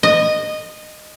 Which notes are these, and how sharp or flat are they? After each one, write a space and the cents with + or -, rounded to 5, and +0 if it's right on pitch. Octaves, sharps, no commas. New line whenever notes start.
D#5 -15